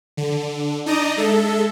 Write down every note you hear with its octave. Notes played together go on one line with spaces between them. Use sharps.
D3
D4 D#4 D5 D#5 A#5 D#6
G#3 A4 E5